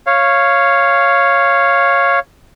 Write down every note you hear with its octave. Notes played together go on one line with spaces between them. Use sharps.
C#5 F5